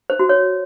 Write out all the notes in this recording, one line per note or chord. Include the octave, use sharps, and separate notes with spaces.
C5
F#4
C#5